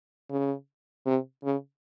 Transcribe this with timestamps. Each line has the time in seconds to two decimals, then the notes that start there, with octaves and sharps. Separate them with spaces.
0.30 C#3
1.06 C3
1.43 C#3